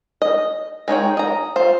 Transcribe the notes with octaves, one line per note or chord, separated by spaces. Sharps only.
D#5
G#3 D#4 C#5 G5
D#5 A#5
F4 C5